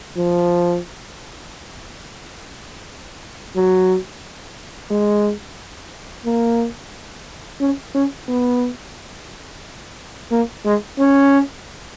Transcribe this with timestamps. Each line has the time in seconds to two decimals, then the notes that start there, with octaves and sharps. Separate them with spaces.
0.17 F3
3.56 F#3
4.91 G#3
6.26 A#3
7.61 C#4
7.95 C#4
8.28 B3
10.31 A#3
10.65 G#3
10.99 C#4